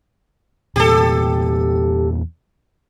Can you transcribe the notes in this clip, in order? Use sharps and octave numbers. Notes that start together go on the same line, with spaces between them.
E2 A#2 G4 A4